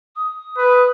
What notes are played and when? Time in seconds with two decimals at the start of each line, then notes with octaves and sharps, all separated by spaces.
0.16 D#6
0.58 B4